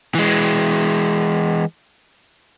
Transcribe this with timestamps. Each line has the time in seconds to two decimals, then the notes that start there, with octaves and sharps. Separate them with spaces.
0.15 E3 G#3